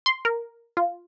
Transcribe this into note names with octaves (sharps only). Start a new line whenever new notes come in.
C6
A#4
F4